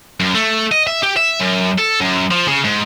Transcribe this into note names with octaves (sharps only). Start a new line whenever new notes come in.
F#2
A3
D#5
E5
G4
E5
F#2
A4
F#2
F3
C#3
G#2